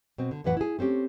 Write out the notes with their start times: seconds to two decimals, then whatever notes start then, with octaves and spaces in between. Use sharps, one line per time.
0.18 B2 C4
0.31 D3
0.44 F2 A2 E3 B4 F#5
0.57 E4 G#4
0.79 A3 C4 C#4 G4